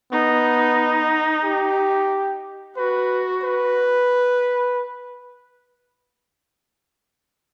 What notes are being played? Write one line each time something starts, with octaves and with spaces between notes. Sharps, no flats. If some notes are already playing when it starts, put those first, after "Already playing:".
B3 D#4
G4
F#4 B4
B4